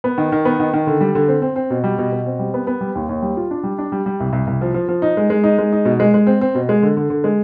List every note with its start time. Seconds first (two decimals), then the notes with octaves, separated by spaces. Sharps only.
0.04 B3
0.18 D#3
0.32 D#3
0.45 B3
0.60 D#3
0.73 D#3
0.87 D3
1.01 G3
1.15 D3
1.28 C4
1.42 C4
1.56 C4
1.70 B2
1.84 G3
1.98 B2
2.12 B2
2.26 C4
2.39 G3
2.54 B3
2.67 B3
2.81 G3
2.95 D#2
3.09 D#2
3.22 G3
3.37 F4
3.51 D4
3.64 G3
3.78 D4
3.92 G3
4.06 G3
4.20 C2
4.33 C2
4.47 C2
4.61 F3
4.74 F3
4.89 F3
5.02 D#4
5.17 G#3
5.30 G#3
5.44 D#4
5.58 G#3
5.72 D#4
5.85 B2
6.00 G#3
6.14 G#3
6.27 C4
6.41 C4
6.55 B2
6.69 G#3
6.82 D3
6.97 D3
7.10 D3
7.24 G#3